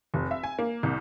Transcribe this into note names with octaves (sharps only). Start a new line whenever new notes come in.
F1
E5
G#5
A#3
C2